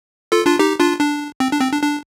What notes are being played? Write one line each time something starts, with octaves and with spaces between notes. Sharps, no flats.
F4 A4
D4 F4
D#4 G4
D4 F4
D4
C4
D4
C4
D4
D4